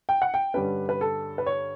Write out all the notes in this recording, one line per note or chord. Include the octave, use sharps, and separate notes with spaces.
G5
F#5
G5
G2 D3 G3 C#4 B4
B4
A4
B4
C#5